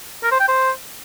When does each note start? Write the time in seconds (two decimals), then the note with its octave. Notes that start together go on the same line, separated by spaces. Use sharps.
0.23 A#4
0.31 C5
0.40 G5
0.48 C5